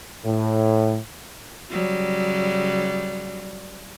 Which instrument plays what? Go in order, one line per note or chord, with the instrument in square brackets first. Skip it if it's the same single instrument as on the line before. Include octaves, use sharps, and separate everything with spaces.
[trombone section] A2
[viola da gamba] C#3 F#3 G3